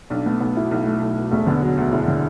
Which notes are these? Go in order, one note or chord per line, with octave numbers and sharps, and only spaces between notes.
B1 D4
A3 B3
B1 B3
B2 E4
B1
A3
B1
B2
E1 A3
D3 B3
F#3 B3
D2 B3
E1 E4
D3